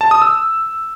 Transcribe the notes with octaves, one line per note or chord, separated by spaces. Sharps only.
A5
D#6
E6